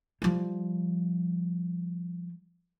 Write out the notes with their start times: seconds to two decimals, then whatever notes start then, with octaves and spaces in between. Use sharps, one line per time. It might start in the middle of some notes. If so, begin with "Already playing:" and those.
0.22 F3 G3